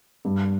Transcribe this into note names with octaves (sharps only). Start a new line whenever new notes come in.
G2